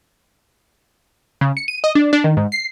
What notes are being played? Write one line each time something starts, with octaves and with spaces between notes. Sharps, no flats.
C#3
C#7
D#7
D#5
D4
D4
D#3
G#2
C7